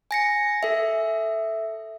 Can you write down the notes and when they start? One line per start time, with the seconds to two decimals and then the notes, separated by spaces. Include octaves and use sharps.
0.11 G#5 A#6 C#7
0.63 A4 E5